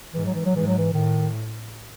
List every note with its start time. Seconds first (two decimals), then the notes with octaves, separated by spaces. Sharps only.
0.14 G#2 E3
0.25 F#3
0.35 E3
0.46 F#3
0.54 G#2 E3
0.67 F#3
0.78 E3
0.93 A2 D#3